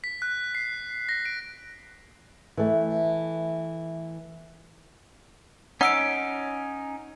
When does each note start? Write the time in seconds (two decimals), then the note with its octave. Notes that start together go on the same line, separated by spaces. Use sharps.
0.04 B6
0.22 F#6
0.55 C7
1.09 A#6
1.25 D7
2.57 E3 A3
5.81 C#4 D#4 F#5 E6 D7